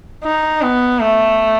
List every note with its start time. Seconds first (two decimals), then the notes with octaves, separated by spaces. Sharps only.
0.24 D#4
0.62 B3
1.01 A3